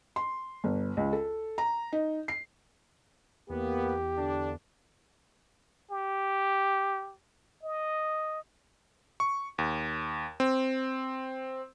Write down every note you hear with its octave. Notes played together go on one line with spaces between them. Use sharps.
C6
G1
C#2
A4
A#5
D#4
C7
E2 A#3 B3 G4
D3 D4
G4
D#5
C#6
D#2
C4